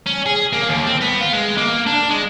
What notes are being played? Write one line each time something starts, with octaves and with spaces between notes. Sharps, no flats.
C#4
G#4
A#3
D#2
C4
B3
F4
G#3
A#3
D4
G#3